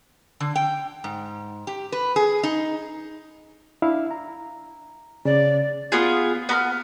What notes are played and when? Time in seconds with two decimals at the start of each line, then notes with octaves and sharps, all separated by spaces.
0.40 D3
0.56 G5
1.04 G#2
1.67 G4
1.92 B4
2.16 G#4
2.43 D#4
3.82 D4 E4 F5
4.11 A#5
5.25 C#3 D5
5.92 B3 F4 G#4
6.49 B3 A#5 F6